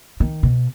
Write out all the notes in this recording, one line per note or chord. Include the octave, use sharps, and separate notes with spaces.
D#3
B2